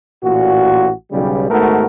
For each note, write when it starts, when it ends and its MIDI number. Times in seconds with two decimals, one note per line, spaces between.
0.24 0.89 33
0.24 0.89 46
0.24 0.89 66
1.12 1.50 35
1.12 1.50 49
1.12 1.50 55
1.50 1.85 32
1.50 1.85 44
1.50 1.85 57
1.50 1.85 59
1.50 1.85 66
1.50 1.85 70